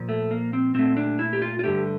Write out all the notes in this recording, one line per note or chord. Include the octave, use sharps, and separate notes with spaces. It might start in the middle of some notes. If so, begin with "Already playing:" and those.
Already playing: A#2 F3
A3
A#3
C4
A#2 A3 C4
D4
E4
G4
F4
F4
G2 D3 A3 G4